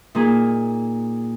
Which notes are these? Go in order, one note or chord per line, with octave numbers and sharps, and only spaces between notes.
A#2 A#3 D#4 G#4